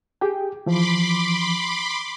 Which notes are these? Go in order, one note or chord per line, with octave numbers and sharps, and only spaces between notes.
G4 G#4 G5
E3 F3 B5 C6 D6